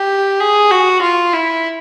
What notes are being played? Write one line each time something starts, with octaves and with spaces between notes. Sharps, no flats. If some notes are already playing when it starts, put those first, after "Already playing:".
Already playing: G4
G#4
F#4
F4
E4